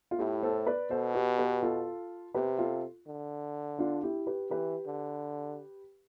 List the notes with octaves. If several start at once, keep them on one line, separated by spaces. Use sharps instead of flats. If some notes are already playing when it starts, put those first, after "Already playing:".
F4
A2 E4 G4
A4 C5
B4 D5
B2 A4 C5
G4 B4
G4 B4
F4 A4
C3 G4 B4
F4 A4
D3
D4 F4
E4 G4
G4 B4
E3 G4 B4
D3